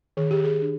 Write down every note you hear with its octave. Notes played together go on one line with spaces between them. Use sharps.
D#3 G#4
G4
G#4
D4